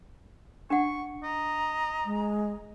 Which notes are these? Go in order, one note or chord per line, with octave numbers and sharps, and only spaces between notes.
D4 F#5 C#6
D#5 A#5
G#3